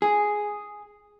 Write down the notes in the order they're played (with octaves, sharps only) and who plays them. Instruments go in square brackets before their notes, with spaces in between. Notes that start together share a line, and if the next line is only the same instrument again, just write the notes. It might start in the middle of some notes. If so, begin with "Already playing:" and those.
[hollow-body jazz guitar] G#4